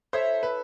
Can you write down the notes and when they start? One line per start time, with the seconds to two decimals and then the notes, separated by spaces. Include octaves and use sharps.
0.13 E4 A4 C5 C#5 E5
0.43 B4